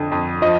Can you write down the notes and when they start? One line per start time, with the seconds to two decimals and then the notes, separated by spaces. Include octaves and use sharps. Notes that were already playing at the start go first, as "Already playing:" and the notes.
Already playing: F2 D3
0.12 F2
0.42 F3 D#5